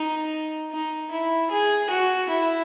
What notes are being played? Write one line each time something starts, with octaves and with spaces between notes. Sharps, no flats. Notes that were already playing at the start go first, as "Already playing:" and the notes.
Already playing: D#4
D#4
E4
G#4
F#4
E4